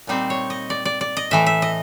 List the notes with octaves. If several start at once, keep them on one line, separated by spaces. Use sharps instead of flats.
A#2 G3 C4 D#4 C5
C#5
D#5
D5
D5
D5
D#5
A2 E3 A3 E5
E5
D#5